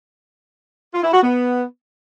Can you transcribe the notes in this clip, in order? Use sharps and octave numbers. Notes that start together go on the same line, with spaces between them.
F4
E4
F#4
B3